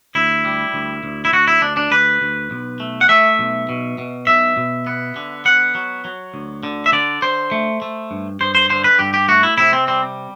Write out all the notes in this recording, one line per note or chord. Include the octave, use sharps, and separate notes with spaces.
D2 E4
G3
D2
D2
E4
D2 F#4
E4
D2 D4
D4
D2 B4
D2
B1
A3
F#5
A3 E5
B1
B2
B2
B1 E5
B2
B3
D3
B3 F#5
F#3
F#3
D2
D3
E5
D3 D5
D3 C5
A3
A3
G2
G2 C5
C5
D3 C5
B4
G2 G4
G4
A3 F#4
E4
C3 E4
C4
G3 C4